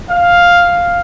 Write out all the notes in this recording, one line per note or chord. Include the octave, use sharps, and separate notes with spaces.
F5